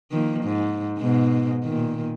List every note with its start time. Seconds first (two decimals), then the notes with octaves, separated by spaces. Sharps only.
0.11 D#3 F3 A#3
0.44 G#2
0.98 G#2 B2
1.64 A#2 D#3